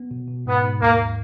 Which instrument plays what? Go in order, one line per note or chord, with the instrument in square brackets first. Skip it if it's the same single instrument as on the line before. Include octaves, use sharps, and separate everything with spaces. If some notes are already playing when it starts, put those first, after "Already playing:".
Already playing: [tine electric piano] B3
B2
B2
[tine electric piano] G#2 [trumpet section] B3
[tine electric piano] G#2
[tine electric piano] D#2 [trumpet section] A#3
[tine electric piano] D#2